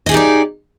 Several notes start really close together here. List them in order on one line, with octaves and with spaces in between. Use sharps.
D#5 G#4 G4 D#4 D5